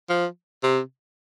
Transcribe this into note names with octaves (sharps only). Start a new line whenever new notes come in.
F3
C3